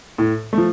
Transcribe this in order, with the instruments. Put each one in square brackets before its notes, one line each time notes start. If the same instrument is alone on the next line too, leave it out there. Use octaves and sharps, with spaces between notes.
[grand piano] A2
A3
F3